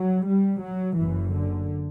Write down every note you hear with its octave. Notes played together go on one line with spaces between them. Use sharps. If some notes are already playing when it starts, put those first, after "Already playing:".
Already playing: F#3
G3
F#3
F#1 E3
F#2
D3